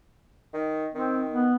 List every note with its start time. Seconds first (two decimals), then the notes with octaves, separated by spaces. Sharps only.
0.54 D#3
0.95 D#3 C4
1.31 B3